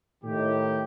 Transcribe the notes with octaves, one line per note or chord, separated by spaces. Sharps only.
A2 D#3 G4